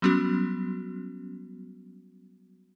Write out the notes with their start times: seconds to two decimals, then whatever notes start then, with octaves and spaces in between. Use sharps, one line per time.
0.02 F#3 G3 B3 C#4 F#4